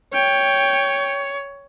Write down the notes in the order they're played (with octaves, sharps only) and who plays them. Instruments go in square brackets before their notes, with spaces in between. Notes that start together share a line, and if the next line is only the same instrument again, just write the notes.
[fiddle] C#5 [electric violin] G5